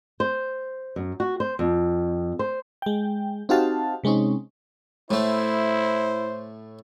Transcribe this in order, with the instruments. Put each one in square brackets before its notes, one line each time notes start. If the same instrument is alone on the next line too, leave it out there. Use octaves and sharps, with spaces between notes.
[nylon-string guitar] C5
F#2
F#4
C5
F2
C5
[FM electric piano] G#3 G5
C4 D#4 F#4 G4 F5 A5
C3 G#3 C4 C#4 D#4
[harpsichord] A2 A3 [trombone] E4 [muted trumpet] C5